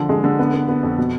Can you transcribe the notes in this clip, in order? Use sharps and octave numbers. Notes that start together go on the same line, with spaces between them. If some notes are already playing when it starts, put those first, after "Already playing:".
Already playing: D3 F3
G#3
D3
B3
B3
B3
F2
B2